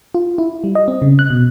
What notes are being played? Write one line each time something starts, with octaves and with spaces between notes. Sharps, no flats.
F4
E4
G3
D#5
C4
C#3
F#6
B2